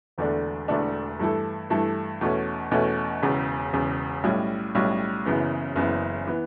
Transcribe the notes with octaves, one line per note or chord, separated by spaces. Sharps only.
E1 E2 D3 A3 D4
E1 E2 D3 A3 D4
G2 E3 A3 E4 A4
G2 E3 A3 E4 A4
E2 B2 A3 C#4
E2 B2 A3 C#4
E1 E2 C#3
E1 E2 C#3
B1 A2 G3 C#4
B1 A2 G3 C#4
F#1 F#2 C#3 E3 B3
F#1 F#2 C#3 E3 B3
E3 B3